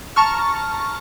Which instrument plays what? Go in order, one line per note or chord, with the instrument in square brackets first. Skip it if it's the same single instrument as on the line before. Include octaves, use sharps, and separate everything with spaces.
[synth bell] A5 A#5 C#6 F6